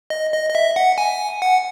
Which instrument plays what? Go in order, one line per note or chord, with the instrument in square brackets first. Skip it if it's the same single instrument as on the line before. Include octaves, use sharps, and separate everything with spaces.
[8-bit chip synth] D#5
D#5
D#5
E5
F#5
G#5
F#5